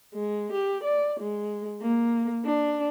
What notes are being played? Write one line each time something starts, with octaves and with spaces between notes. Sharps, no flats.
G#3
G4
D5
G#3
A#3
D4